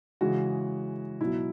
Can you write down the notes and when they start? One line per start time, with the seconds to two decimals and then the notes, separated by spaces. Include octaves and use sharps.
0.21 C#3 E3 G#3 F#4
1.20 B2 F#3 E4